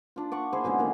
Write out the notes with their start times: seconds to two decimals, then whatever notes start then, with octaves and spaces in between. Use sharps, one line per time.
0.16 D4 F4
0.32 D5 F#5 C#6
0.53 E4 G#4 C5
0.64 B2 D3 G#3 C#4
0.79 D#3 A#3 F#4